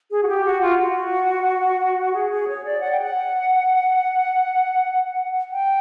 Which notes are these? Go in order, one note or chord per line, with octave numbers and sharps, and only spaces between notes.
G#4
F#4
G4
F#4
F4
F#4
G#4
G#4
C#5
D5
F#5
G5
F#5
G5